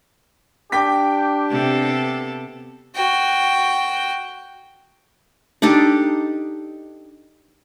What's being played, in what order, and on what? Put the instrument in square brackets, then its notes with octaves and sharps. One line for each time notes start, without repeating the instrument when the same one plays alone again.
[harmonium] D4 [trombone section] G4 [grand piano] G5 D6 B6
[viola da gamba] C3 B3 A4
[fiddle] F#4 G5
[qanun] D4 D#4 G4 A4